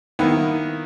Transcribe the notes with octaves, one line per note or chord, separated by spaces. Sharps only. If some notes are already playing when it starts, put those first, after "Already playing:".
D#3 A#3 B3 E4